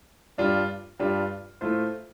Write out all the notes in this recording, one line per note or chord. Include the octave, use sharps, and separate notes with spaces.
G2 G3 D4 F4
G2 G3 D4 F4
A2 A3 F4 C5